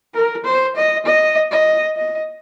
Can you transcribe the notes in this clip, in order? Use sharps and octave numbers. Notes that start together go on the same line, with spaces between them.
A#4
C5
D#5
D#5
D#5
D#5